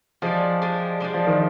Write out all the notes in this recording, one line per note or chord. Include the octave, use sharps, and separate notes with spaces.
F3 G#3 D4 G4 D5
G#3 D4 G4 D5
G#3 D4 G4 D5
F3
D#3